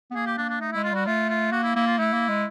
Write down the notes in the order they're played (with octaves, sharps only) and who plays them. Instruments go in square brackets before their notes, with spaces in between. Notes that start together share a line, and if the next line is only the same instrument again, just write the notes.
[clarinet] B3
[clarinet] A#3 [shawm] G#4
[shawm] G4
[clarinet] A#3 [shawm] D4
[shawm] D4
[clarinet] A3 [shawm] D#4
[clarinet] G#3 [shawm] E4
[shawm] F4
[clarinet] G3 [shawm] F#4
[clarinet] A3 [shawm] F4
[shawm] F4
[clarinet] A#3 [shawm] F#4
[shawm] E4
[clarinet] A#3 [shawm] E4
[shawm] F4
[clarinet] A3 [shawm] E4
[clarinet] A#3
G#3